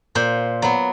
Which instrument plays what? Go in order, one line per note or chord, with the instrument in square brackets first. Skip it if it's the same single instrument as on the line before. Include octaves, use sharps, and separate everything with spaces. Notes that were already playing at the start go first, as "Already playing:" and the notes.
[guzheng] A#2 C5
F#3 B3